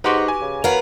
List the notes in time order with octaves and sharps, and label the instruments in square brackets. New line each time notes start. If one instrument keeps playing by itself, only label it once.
[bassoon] G#2 [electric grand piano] D#4 F#5 C6 [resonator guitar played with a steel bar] F#4 G4 B4
[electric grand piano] G#5
[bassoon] C#3
[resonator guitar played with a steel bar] B3 C#5 F5 [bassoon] F#4 [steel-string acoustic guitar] A#4 B4